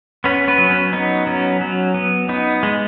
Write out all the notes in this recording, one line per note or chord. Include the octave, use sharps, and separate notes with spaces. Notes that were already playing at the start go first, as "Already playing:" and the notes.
B3 C#4 B4
B3 B4
F#3
C#4
B3 D#4
F#3 C#4
F#3
B3
B3 D#4
G#3